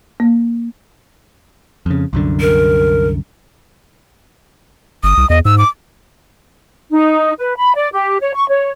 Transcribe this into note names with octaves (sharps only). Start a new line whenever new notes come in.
A#3
F2 C#3
C2 F#2 D3
A#4
G1 D#6
C2
E2 D#5
G#2 E6
D6
D#4
B4
B5
D5
G4
C#5
C#6
C#5